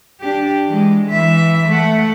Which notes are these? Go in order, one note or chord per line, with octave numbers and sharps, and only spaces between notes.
D4 G4
E3 G#3
E3 E5
A3 F#5